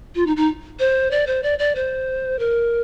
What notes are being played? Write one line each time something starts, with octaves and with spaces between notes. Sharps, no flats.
F4
D#4
D#4
C5
D5
C5
D5
D5
C5
A#4